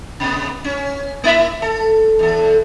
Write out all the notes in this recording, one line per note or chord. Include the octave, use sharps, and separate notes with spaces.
C3 B3
C#4
A#3 E4 E5
A4
E2 A4